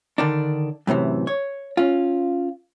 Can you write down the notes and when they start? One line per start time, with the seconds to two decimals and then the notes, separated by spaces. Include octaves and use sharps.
0.18 D3 D#3 D4
0.87 F#2 A2 C3 E3
1.27 C#5
1.77 C#4 F4